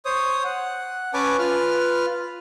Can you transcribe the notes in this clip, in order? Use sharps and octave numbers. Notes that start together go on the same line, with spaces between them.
C5 C#5 D#6
F#5
C#4 B4 C#5 G#5 A5 D6
F4 B4 F6